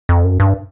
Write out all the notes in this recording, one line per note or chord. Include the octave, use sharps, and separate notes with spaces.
F2
F#2
G2